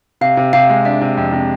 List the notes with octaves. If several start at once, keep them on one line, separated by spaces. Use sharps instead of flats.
C3 F5
C3
C3 F5
G#3
D4 E5
C3
F2
C3